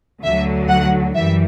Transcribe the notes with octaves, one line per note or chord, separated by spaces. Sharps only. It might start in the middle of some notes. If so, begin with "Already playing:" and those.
D2 D3 F#3 E5
F#5
F#2 E3 G3 E5